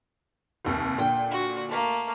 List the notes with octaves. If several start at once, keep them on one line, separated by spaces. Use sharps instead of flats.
F1 D#2 C3
A#2 D3 G5
F#4
A3 A#3